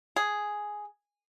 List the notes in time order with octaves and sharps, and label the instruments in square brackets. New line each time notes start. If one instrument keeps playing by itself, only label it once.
[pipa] G#4